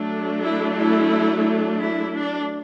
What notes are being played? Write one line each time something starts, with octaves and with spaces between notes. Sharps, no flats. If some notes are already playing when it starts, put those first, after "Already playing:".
Already playing: F#3 A3 D4
E4
E4
E4
D4